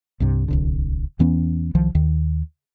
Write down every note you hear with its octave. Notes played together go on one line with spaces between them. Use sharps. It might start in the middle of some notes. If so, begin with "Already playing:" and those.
C2 G2 C3
D1 C2 D3
E2 E3 B3 C#4
C2 D#3 F3
D#2 D#3